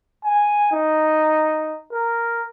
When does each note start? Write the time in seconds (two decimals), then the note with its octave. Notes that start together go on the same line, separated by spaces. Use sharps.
0.25 G#5
0.73 D#4
1.93 A#4